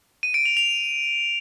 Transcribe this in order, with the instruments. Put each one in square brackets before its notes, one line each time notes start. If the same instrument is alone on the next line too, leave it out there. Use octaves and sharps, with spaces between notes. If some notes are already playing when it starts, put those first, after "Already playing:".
[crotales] D#7
D7
F7
F7